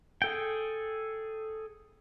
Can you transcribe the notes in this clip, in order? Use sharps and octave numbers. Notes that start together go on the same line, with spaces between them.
G#4 A4 G5